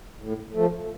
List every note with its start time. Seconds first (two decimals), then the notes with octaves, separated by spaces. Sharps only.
0.22 A2
0.54 F3 A3